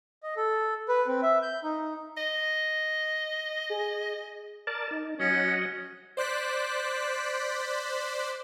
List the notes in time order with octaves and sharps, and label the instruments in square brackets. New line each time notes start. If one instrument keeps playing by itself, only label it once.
[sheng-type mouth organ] D#5
A4
B4
C4
E5
G6
D#4
[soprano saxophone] D#5
[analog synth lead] G#4
[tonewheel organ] A#4 D5 A5
D#4
[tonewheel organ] F#3 D#5 F#5 [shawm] C#4
[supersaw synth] C5 D5 F#6 B6